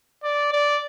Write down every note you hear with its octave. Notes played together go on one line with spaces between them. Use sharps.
D5
D5